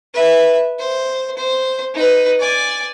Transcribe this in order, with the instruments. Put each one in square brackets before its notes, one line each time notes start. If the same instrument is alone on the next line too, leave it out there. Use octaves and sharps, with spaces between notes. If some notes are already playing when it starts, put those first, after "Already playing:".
[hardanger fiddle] B4 E5
C5
C5
D#4 B4
D5 G#5